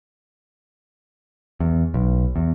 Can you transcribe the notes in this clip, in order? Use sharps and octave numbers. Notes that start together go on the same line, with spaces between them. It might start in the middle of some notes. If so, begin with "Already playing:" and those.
E2
B1
E2